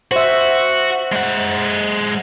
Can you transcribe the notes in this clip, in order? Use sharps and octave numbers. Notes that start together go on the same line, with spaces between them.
F#4 C5 E5
G#3 F#5